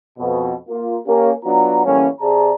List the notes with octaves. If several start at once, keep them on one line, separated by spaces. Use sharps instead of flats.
F2 B2
A#3 F4
A#3 C#4 G4 A#4
F#3 B3 D4 F4 F#4 A#5
F#2 A2 E3 G3 A#3 C#4
C3 G#4 D5 A5 A#5